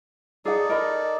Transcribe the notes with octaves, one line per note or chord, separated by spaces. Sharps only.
D#4 G#4 A4 D5 F#5
A#4 D#5 B5